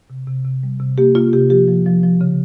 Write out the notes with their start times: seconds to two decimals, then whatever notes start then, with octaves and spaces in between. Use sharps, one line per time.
0.10 C3
0.27 C3
0.45 C3
0.63 G3
0.80 C3
0.98 A#3 G4
1.15 A#3 F4
1.33 C3 G4
1.50 F3 G4
1.68 F3
1.86 F3
2.03 F3
2.21 C#3